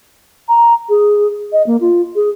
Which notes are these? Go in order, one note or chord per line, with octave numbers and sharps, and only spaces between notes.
A#5
G#4
D#5
A#3
F4
G#4